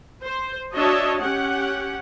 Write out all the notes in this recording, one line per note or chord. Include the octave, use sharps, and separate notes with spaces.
C5
D4 F#4 C#5 D#5 E5 A5
C#4 G4 F#5